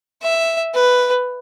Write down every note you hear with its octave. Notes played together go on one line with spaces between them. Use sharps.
E5
B4